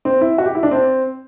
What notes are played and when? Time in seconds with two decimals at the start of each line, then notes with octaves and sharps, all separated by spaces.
0.05 C4
0.21 E4
0.38 F#4
0.46 G4
0.55 E4
0.63 D4
0.71 C4